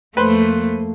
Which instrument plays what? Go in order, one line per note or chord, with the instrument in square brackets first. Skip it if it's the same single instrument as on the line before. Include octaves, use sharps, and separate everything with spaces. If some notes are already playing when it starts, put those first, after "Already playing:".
[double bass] F2 A#3 [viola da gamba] A3 [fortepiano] B4 C5